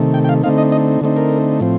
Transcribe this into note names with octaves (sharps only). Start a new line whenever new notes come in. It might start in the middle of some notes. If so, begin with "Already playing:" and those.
Already playing: C3 D#3 A3
G5
G5
F5
D3 A3 C4 D#4 F5
D#5
D#5
D3 A3 C4 D#4
A#4
A2 F3 C4